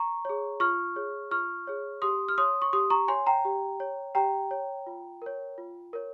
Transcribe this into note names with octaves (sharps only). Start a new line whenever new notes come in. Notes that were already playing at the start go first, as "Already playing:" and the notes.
Already playing: A#5 C#6
G#4 C#5
F4 C#6 F6
G#4 C#5
F4 C#6 F6
G#4 C#5
G4 C6 D#6
F6
C#5 C6 D#6
C#6
G4 C6 D#6
A#5 C#6
C#5 G#5 C6
G5 A#5
G4
C#5
G4 G5 A#5
C#5
F4
A#4 C#5
F4
A#4 C#5